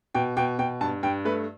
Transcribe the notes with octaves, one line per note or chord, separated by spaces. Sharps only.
B2 G5
B2 G5
B2 G5
G2 A5
G2 G5
A3 B4